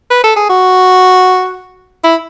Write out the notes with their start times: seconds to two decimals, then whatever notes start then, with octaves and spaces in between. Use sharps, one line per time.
0.11 B4
0.24 A4
0.36 G#4
0.49 F#4
2.04 E4